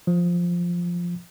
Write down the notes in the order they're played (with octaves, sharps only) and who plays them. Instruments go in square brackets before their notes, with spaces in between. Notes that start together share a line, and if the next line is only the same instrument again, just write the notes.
[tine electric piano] F3